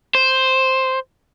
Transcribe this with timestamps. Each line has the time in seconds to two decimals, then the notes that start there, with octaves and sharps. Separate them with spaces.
0.15 C5